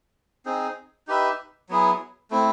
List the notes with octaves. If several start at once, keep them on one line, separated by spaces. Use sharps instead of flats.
C4 D#4 G#4
D#4 G4 B4 E5
F#3 B3 E4 G#4
A3 C4 E4